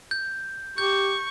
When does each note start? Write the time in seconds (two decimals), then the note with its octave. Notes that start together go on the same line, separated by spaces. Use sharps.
0.11 G6
0.78 G4 C#6 G6